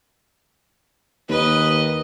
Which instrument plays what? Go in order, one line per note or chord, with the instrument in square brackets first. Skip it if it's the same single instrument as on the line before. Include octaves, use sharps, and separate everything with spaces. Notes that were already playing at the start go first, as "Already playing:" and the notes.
[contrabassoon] D#2 [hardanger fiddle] B4 D#5